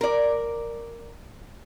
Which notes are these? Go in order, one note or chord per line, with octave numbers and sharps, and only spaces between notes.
A#4 D5